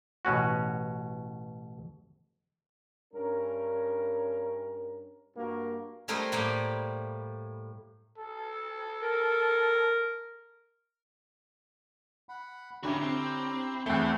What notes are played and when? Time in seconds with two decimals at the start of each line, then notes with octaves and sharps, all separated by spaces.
0.25 A1 B2 C#4 F#4
3.13 G2 C#4 A#4
5.36 G2 A#3 F#4 A#4
6.08 G3 A3 E4 A#4 C5 D#5
6.32 A2 G3 A#3 D5 G5
8.18 A4
9.02 A#4
12.29 F#5 B5
12.83 D3 C#4 E4 F#4 G4 E5 A#5
13.02 C4
13.86 E2 A3 C4 E4 A5 B5